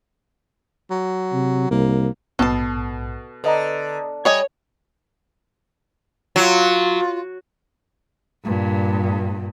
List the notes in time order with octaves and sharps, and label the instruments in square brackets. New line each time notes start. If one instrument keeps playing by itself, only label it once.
[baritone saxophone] F#3
[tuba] C3
[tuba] C2 [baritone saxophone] A#3
[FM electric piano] A#1 G#2 [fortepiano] B2 [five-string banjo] A4 A5
[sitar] D3 [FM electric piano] B4 D#5 A#5
[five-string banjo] G3 D#5 G#5 [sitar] C#5
[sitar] F#3 [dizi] F4
[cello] G2 A#2